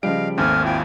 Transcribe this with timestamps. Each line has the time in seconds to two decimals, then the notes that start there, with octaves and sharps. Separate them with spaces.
0.03 C#3 F3 G3 D#5 F5 D7
0.38 G#1 D#2 A3 C4 G#5 F6
0.64 E4 F4 G5 G#5